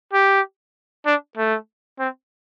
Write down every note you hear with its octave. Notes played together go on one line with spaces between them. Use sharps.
G4
D4
A3
C4